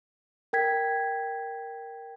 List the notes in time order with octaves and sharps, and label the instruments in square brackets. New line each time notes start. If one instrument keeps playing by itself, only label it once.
[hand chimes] A#4 G5 G#6 B6